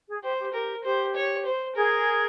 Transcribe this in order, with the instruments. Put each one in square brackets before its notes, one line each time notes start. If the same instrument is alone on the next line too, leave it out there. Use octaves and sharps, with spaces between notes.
[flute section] G#4
[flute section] G4 [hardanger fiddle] C5
[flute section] G4
[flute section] G4 [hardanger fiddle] A#4
[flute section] G4 [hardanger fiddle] C5
[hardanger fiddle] C#5
C5
[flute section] G#4 [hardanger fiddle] A#4